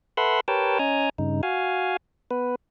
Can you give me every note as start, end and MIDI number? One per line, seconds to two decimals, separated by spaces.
0.17 0.40 69
0.17 0.40 71
0.17 0.40 76
0.17 0.40 78
0.17 0.40 83
0.17 0.40 84
0.48 0.78 67
0.48 0.78 70
0.48 0.78 71
0.48 0.78 73
0.48 0.78 79
0.48 0.78 81
0.79 1.09 61
0.79 1.09 75
0.79 1.09 80
0.79 1.09 82
1.18 1.41 43
1.18 1.41 49
1.18 1.41 63
1.43 1.97 66
1.43 1.97 77
1.43 1.97 80
2.31 2.55 59
2.31 2.55 71